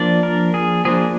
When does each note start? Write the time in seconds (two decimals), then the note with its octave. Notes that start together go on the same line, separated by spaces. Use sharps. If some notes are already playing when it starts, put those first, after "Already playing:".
Already playing: F3 A#3 D4 D5
0.23 A#4
0.54 G#4
0.85 F3 A#3 D4 G#4